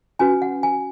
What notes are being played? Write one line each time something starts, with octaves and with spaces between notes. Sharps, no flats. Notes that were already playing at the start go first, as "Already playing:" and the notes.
C#4 F#4 B4 G#5
F#5
G#5